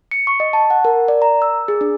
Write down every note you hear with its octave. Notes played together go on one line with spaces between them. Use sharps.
C#7
C#6
D#5
A5
F#5
A#4
D5
A#5
E6
G#4
D4